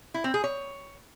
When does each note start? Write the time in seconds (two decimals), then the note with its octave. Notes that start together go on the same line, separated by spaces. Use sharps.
0.14 E4
0.24 C4
0.34 G#4
0.44 C#5